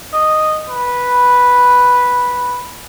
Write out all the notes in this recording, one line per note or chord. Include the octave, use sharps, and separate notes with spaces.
D#5
B4